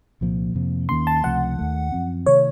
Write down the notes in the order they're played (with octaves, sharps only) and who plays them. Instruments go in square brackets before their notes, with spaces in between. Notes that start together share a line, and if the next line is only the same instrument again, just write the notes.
[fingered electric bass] C2 A#2 F3 A#3
F2 C3 F3 A#3
[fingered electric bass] D#2 D#3 A#3 C#4 [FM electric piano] C6
[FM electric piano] A5
[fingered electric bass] C#2 C3 F3 A3 [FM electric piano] F#5
[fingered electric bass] D#2 D#3 A3
F#2 F3 C4
[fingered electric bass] C3 D#3 A3 [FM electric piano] C#5